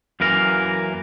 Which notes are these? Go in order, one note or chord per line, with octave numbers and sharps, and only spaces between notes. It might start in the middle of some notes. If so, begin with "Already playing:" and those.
F#2 E3 A#3 A#4